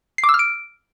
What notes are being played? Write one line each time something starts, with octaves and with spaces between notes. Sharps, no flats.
C7
D6
E6
F6
D7